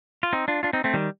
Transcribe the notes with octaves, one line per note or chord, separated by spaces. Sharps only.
F4
C4 D#4
D4 F4
D4 F4
C4 D#4
A3 C4
D#3 G3